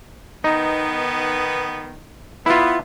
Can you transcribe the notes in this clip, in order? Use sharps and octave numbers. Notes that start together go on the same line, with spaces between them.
D#3 B3 D#4
B3 E4 F4